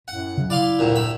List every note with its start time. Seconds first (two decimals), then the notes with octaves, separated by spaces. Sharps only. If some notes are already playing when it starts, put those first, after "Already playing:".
0.08 F#2 A2 F#5
0.37 C#3 F#3
0.50 E4 D5 F5 C6
0.79 D2 G2 A#2
0.96 A2 B5